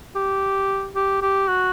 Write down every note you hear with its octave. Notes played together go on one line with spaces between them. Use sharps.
G4
G4
G4
F#4